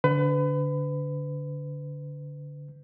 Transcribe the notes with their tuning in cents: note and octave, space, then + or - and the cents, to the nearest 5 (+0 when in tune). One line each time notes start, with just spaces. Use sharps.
D3 -15 B4 +30